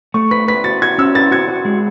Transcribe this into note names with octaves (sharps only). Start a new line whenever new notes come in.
A3 C#6
B4 B6
B4 B6
F#4 A6
F#4 G#6
C#4 E6
B4 A6
F#4 G#6
F#4
G#3